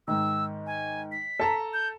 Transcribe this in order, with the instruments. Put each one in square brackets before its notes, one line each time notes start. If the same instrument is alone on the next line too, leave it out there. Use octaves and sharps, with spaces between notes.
[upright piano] G#2 D#3 [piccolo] E6
[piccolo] G#5
B6
[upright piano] A4 A5 A#5
[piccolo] G6